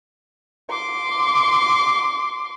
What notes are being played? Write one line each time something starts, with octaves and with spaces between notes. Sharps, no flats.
C6 D6